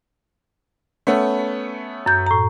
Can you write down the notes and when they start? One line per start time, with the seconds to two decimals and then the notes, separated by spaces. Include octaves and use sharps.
1.07 A3 B3 C#4
2.06 F#2 G6
2.26 A2 A#5